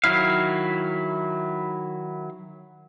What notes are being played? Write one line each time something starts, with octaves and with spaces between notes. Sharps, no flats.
D#3 F#3 E4 F5